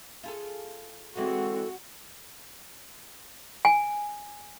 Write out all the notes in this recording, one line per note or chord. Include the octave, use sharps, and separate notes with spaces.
F4 G#4 A4
D3 E3 G#3 C4 F#4 A4
G#5